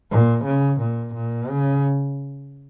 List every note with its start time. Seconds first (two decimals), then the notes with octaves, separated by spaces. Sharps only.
0.11 A#2
0.45 C#3
0.81 A#2
1.15 A#2
1.49 C#3